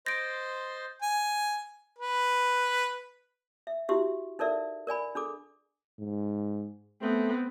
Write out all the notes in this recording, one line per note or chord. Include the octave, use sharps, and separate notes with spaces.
C5 D#5 C6 G6 A6 A#6 D7
G#5
B4
E5
E4 F#4 G4 E5
D#4 A4 A#4 D5 E5
A#4 D5 G#5 B5
D4 G#4 A4 D6
G#2
A3 B3 C4